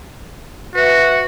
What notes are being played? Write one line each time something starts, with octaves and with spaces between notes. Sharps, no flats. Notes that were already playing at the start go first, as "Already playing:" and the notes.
F#4 B4 E5